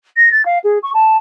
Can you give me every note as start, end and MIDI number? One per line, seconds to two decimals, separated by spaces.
0.16 0.29 94
0.31 0.44 93
0.45 0.59 77
0.64 0.78 68
0.83 0.90 85
0.94 1.16 81